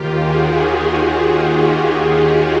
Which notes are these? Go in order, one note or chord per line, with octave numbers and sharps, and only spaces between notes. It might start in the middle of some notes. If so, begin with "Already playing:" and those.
Already playing: D#2 D#3 F4 G4
F#4 G#4
F#4
F4 G4